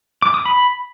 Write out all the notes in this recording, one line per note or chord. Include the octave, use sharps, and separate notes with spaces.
D6
D#6
B5